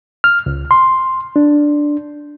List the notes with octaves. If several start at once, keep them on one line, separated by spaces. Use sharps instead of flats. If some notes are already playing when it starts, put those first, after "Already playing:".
F6
C#2
C6
D4